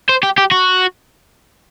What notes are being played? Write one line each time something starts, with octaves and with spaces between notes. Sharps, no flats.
C5
G4
G4
F#4